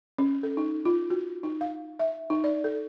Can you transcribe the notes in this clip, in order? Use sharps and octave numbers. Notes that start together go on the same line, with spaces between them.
C#4
A4
D#4
F4
F#4
D#4
F5
E5
D#4
D5
A4